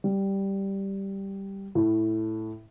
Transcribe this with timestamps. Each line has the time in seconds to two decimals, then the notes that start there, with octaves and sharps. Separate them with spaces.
0.04 G3
1.75 A2